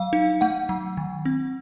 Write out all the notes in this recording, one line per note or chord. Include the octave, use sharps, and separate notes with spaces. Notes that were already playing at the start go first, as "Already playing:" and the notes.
Already playing: F#3 F5
D#4
A3 F#5
F#3
D#3
C4